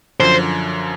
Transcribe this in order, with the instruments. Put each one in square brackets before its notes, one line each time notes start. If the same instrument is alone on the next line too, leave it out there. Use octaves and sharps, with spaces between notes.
[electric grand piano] F#2 D3 F3 [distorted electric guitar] C5